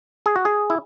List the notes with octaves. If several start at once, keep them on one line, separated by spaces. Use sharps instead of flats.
G#4
F#4
G#4
E4